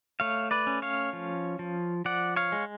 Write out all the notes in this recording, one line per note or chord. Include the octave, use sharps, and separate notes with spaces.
A3 C#5 F5
B4 D5
C#4
C#5 F5
F3
F3
F3 D5 F#5
C#5 F5
G#3